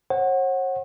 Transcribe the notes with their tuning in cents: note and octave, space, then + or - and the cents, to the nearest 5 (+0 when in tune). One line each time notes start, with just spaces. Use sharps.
C#5 -45 F#5 +0